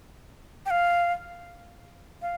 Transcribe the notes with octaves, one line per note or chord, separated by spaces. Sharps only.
G5
F5
F5